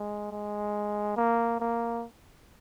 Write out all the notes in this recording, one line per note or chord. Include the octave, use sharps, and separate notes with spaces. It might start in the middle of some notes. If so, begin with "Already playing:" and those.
Already playing: G#3
G#3
A#3
A#3